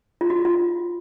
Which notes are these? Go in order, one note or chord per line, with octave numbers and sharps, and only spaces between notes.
F4
F#4
F4